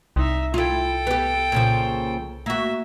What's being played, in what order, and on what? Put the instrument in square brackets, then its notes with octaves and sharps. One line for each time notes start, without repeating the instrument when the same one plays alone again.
[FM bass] C2 [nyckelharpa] D#4 E5
[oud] E4 F4 [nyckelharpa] A4 G5
[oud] B3 G4
A#2 C#3 F3
[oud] A#3 F#4 [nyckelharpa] E5